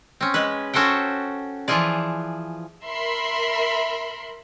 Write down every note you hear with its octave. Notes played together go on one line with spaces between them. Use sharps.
C4 C#4
G#3 B4
C#4 F#4 A4 C5 G5
E3 F3 F4 G#4 D5
A#4 E5 B5 C6